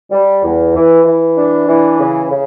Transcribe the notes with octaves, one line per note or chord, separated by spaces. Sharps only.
G3
E2
E3
E3
D4
E3
C#3
C#3